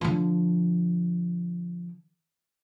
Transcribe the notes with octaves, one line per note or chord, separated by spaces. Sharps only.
D3 F3